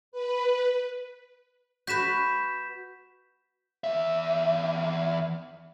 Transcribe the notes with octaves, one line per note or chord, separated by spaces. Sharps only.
B4
F#4 B4 G6 B6 E7
E2 E5